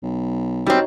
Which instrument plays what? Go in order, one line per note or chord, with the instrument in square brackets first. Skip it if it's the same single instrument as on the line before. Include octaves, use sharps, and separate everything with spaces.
[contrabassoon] B1
[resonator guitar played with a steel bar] G3 C4 [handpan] D#4 F#4 C#5